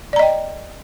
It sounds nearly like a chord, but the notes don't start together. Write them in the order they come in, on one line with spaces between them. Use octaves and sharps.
D5 A#5 D#5 G5